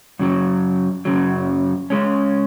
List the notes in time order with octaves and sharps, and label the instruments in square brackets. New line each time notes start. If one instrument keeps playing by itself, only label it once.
[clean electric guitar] F#2 C#3 F#3
F#2 C#3 F#3
C#2 C#3 G#3 C#4